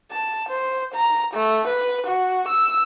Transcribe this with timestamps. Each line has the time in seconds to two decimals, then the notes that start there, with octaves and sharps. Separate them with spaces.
0.11 A5
0.49 C5
0.95 A#5
1.34 A3
1.68 B4
2.07 F#4
2.48 E6